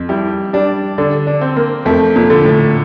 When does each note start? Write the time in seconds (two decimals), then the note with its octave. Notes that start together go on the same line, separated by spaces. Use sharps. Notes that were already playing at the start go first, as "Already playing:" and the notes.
Already playing: F2
0.09 G3 E4
0.53 G3 D4
0.98 D3 D4
1.27 D4
1.41 C4
1.56 A#3
1.85 F2 A3
2.16 A#2
2.30 D3
2.45 A2